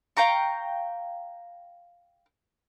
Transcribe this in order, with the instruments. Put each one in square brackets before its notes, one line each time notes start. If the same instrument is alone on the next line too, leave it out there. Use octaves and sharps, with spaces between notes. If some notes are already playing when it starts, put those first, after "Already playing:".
[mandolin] F5 G5 A#5 C#6